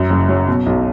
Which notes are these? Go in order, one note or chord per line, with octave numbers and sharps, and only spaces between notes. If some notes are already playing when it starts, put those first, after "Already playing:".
Already playing: F#2
F#1
F#3
B2
B1